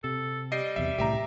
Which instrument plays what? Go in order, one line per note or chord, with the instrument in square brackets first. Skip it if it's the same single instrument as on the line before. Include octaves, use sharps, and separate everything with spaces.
[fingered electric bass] C3 [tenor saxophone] A4
[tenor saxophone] G3 [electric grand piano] D#5 C7
[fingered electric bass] B1 E2 C3 [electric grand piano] E5
[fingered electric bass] C2 A2 C#3 [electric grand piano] G4 E5 A#5